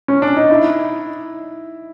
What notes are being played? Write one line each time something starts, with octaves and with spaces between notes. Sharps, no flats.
C#4
D4
D#4
E4